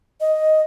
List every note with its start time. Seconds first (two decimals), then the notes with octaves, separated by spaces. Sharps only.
0.21 D#5